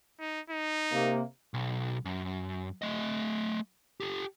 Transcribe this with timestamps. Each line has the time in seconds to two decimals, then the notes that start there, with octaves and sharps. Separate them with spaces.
0.20 D#4
0.50 D#4
0.92 C3 A#3
1.54 B1
2.05 F#2
2.82 A3 D#5
4.00 G4 A4